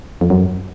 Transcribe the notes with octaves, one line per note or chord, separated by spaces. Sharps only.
F2
F#2